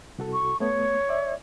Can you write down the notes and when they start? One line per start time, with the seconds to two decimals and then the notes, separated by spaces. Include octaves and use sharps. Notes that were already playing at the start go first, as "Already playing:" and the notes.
0.18 C2 F#4 A4
0.33 C#6
0.60 A3 B3 C#5
1.09 D5 E5